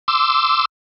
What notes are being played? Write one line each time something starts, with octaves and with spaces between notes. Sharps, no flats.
C6 D6 E6